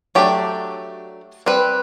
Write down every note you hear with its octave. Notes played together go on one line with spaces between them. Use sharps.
F#3 A3 D4 G4
G3 C4 B4